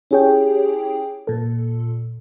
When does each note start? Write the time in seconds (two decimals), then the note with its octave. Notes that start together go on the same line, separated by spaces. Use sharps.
0.11 C#4 E4 G4 G#4 C#5 G5
1.27 A#2 A4